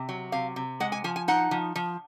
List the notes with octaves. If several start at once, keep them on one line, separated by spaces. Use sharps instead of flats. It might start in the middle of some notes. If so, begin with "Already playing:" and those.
Already playing: C3
F#3
C3 F5
C3
G#3 F#5
G#5
F3 G#5
G#5
D#4 F#5
F3
F3